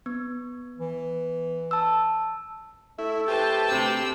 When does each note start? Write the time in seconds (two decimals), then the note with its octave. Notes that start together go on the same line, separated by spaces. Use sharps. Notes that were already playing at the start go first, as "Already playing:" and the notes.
0.06 B3
0.80 E3
1.71 A5 E6
2.99 A3 E4
3.28 G4 B4 C5 A5
3.69 D2 C3 E6